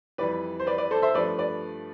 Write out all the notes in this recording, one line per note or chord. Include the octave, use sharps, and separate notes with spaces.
F2 E3 G3 B4 D5
C5
B4 D5
B4 D5
A4 C5
C5 E5
G2 F3 A3 B4 D5
B4 D5